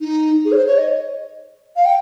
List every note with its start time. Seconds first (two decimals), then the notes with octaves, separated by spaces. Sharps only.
0.01 D#4
0.45 G#4
0.52 C#5
0.56 C5
0.67 C#5
0.78 D#5
1.76 F5
1.85 G5